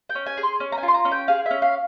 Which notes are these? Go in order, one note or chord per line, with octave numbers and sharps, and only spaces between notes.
G5
C#4
G#5
G#4
C6
C#4
A#5
G#5
F4
C6
A#5
C#4
G5
G#4 F5
C#4 E5
F5